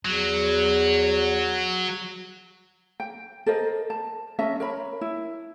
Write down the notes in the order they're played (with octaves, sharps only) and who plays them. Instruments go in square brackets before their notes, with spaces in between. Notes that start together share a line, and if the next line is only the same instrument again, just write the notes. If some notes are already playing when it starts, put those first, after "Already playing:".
[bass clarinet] E2 [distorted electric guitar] F#3
[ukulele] G5
A4 A#4 C5 D#5
A5
C#4 D#5 E5 A5
A#4 C#5 B5
E4